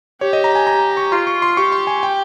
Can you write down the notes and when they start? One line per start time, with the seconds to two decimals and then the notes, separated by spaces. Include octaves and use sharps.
0.21 G4 C#5
0.33 D#5
0.44 A#5
0.55 G#5
0.67 A#5
0.97 C#6
1.11 F4 C6
1.27 C#6
1.42 C6
1.57 G4 C#6
1.72 C6
1.87 G#5
2.03 G5